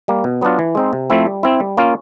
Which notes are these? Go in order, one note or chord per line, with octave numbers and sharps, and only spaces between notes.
G3 A#3
B2
F#3 B3 D4 F4
E3
G#3 C4 D#4
C3
F3 A3 C4 E4
G3
C4 E4
G3
A#3 C#4 F4